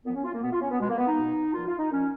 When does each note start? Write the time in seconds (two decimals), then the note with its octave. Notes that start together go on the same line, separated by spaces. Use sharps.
0.06 A#2 F3 B3
0.15 C#4
0.24 F4
0.33 A#3
0.42 B2 B3
0.52 F4
0.61 C#4
0.70 B3
0.80 B2 G#3
0.89 A#3
0.98 B3
1.07 D#4
1.17 B2
1.53 A#2 F3 F4
1.66 F4
1.79 D#4
1.91 A#2 F3 C#4